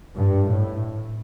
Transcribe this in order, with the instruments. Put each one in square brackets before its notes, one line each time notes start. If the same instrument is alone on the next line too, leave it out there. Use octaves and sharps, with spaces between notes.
[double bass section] G2
A2